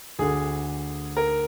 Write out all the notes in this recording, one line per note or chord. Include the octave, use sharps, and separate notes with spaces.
D2 D3 G#4
A#4